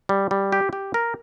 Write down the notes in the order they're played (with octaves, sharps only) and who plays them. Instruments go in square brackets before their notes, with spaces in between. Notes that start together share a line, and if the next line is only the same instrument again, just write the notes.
[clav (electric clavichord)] G3
G3
G4
G4
A#4